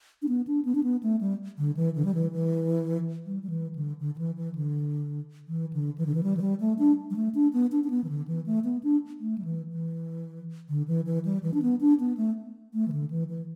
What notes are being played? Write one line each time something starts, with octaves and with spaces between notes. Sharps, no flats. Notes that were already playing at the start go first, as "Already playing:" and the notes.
D4
B3
D4
B3
D4
B3
A3
G3
D3
E3
D3
G3
E3
E3
G3
G3
E3
D3
D3
D3
E3
E3
D3
E3
D3
E3
D3
E3
G3
E3
G3
A3
D4
G3
A3
D4
B3
D4
D4
B3
E3
D3
E3
A3
B3
D4
A3
G3
E3
E3
D3
E3
E3
G3
E3
D4
B3
D4
B3
A3
A3
E3
D3
E3
E3